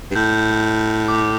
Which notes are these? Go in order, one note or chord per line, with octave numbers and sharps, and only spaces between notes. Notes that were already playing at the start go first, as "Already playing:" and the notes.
G2
A2 G6
D6